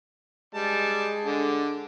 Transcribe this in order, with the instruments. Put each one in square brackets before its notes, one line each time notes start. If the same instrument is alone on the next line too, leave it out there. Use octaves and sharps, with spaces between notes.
[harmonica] G3 A5 [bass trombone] G#3
[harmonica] D3